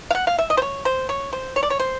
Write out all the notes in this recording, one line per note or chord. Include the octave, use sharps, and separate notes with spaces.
F5
F#5
F5
E5
D#5
C5
C#5
C5
C#5
C5
C#5
D5
C#5
C5